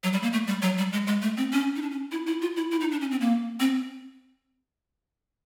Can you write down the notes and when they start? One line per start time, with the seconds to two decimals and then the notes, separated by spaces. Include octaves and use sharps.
0.04 F#3
0.13 G3
0.23 A#3
0.33 A3
0.47 G3
0.62 F#3
0.78 G3
0.93 G#3
1.07 G#3
1.22 A3
1.37 C4
1.53 C#4
1.76 D#4
1.82 D4
1.91 C#4
2.11 E4
2.27 E4
2.42 F4
2.56 E4
2.72 E4
2.81 D#4
2.92 D4
3.01 C#4
3.11 C4
3.21 A#3
3.60 C4